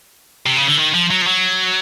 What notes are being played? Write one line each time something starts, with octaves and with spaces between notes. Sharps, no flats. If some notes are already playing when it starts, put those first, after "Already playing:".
C3
C#3
D3
D#3
F3
F#3
F3
F#3